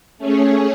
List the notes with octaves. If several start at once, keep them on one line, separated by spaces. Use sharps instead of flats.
A3 C#4 G#4 C#5